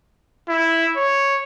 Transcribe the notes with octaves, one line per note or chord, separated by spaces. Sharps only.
E4
C#5